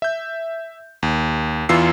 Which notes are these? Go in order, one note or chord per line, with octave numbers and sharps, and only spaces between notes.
E5 G6
D#2
E2 E3 F4 E6 C7